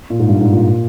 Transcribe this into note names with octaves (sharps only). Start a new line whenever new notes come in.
A#2
G#2
G2
G#2
A#2